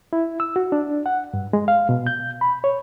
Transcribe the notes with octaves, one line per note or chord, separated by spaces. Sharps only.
E4
E6
F#4
D4
F#5
G2
G#3
F5
B2
G6
B5
C#5